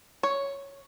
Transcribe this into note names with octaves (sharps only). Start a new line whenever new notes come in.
C#5